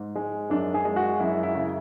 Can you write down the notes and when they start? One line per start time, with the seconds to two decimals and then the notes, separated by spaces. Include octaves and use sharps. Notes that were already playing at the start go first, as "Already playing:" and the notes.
Already playing: G#2
0.16 G#3
0.50 F#2 D4
0.74 G#4
0.85 G#3
0.96 F#4
1.20 F#2 E4
1.43 E4
1.55 C#3